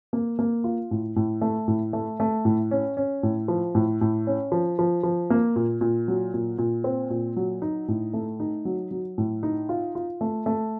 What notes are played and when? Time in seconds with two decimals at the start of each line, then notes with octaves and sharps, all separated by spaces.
0.13 A#3
0.39 A#3
0.64 F4
0.91 A2
1.16 A2
1.41 A3
1.68 A2
1.93 A3
2.20 A3
2.45 A2
2.71 C#4
2.97 C#4
3.23 A2
3.48 F3
3.75 A2
4.01 A2
4.27 C#4
4.52 F3
4.79 F3
5.03 F3
5.30 A#3
5.56 A#2
5.81 A#2
6.08 F#3
6.34 A#2
6.58 A#2
6.84 C4
7.10 A#2
7.36 F#3
7.62 D#4
7.88 A2
8.14 A3
8.40 D#4
8.65 F#3
8.91 F#3
9.18 A2
9.43 D#4
9.69 F4
9.95 F4
10.21 A3
10.46 A3